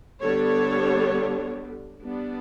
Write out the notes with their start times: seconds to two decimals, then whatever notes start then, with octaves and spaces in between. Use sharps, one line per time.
0.22 D3 G3 B3 D4 A4 C#5
2.03 G3 B3 D4